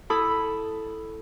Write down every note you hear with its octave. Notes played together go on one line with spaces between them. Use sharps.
E4 A4 B5 D#6